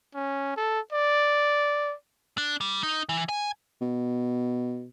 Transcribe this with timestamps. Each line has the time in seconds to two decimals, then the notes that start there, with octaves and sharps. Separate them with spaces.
0.15 C#4
0.57 A4
0.93 D5
2.38 D4
2.61 G3
2.83 D#4
3.09 E3
3.29 G#5
3.82 B2